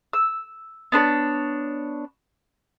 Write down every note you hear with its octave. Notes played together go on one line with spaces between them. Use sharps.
E6
B3 D4 C5 C#5